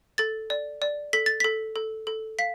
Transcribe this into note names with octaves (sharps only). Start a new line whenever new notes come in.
A4 A6
D5
D5
A4 B6
A6
A4 B6
A4
A4
F5 B6